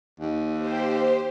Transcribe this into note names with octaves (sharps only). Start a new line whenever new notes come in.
D#2
G4 C5